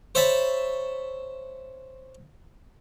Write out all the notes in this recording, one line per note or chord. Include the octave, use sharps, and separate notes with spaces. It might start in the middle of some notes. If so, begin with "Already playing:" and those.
C5 C#5 E5 A5 B5